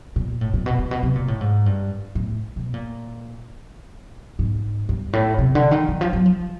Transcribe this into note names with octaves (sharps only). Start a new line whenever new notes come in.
A#2
A2
A#2
B2
A#2
B2
C3
A#2
A2
G#2
G2
A2
B2
A#2
G#2
G2
A2
C3
D3
D#3
D#3
F3
F#3
F3